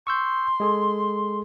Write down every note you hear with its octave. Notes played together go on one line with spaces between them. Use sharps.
C6 C#6 E6 G6
G#3 G#4 A4